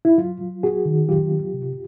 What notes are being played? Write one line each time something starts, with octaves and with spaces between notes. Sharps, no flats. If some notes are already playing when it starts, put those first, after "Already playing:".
E4
F#3 F4
F#3
B3 F#4 G#4
D#3
F#3 F4 G4
B3
C3